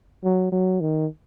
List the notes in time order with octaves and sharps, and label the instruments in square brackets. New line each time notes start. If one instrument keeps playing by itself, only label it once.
[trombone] F#3
F#3
D#3